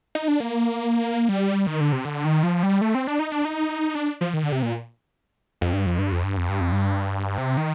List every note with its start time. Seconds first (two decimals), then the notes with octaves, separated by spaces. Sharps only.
0.15 D#4
0.28 D4
0.40 A#3
1.29 G3
1.67 D#3
1.81 D3
1.92 C3
2.05 D3
2.25 D#3
2.43 F3
2.63 G3
2.81 A3
2.95 C4
3.07 D4
3.19 D#4
3.32 D4
3.45 D#4
3.95 D4
4.21 F3
4.34 D#3
4.43 D3
4.52 C3
4.63 A#2
5.61 F2
5.73 G2
5.86 F2
5.99 G2
6.12 F2
6.24 G2
6.37 F2
6.49 G2
6.61 F2
6.72 G2
7.38 C3
7.57 D#3